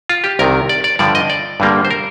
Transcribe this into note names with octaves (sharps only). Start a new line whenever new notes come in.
F4
G4
C2 C3 D#3 A#4
D5
D5
G2 D3 F3 D5
D#5
D5
G2 D3 G3 A#3
C5
A#4